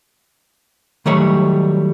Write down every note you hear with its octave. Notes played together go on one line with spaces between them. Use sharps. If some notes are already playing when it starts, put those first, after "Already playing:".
D#3 F#3 G3 A3 C#5